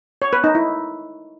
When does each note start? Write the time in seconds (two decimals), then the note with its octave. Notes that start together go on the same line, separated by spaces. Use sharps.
0.22 C#5
0.33 B4
0.44 D#4
0.55 E4